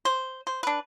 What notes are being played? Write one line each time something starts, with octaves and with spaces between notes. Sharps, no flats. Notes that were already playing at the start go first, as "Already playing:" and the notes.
C5
C5
D4 B4